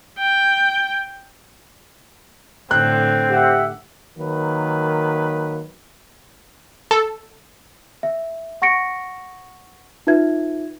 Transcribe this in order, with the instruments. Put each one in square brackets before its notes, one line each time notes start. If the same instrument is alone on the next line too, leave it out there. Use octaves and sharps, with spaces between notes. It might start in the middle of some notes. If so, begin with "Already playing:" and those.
[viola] G5
[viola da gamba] A2 D3 [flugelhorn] C4 [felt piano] F#6
[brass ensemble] G4 E5 F#5
[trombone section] D#3 F#3 A#3 B4
[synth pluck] A4
[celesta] E5
F#5 C#6 A#6 C#7 D7
D#4 F4 B4 E5 G#6